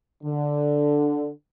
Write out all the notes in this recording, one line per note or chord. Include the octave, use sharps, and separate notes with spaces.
D3